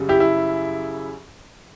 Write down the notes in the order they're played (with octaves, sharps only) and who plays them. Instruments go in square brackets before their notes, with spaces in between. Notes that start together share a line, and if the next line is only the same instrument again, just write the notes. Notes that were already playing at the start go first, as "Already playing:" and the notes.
Already playing: [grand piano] F#2 C#3 G3
E4 G4
E4